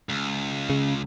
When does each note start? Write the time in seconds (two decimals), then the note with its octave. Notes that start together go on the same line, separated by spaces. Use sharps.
0.09 C#2
0.70 C#3